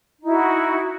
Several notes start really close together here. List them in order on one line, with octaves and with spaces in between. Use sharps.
D#4 E4 F#4